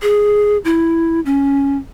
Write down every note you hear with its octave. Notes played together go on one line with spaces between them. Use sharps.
G#4
E4
C#4